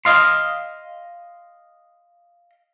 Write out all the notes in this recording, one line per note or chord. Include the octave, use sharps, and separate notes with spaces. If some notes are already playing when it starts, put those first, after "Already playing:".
D#5 F5 C6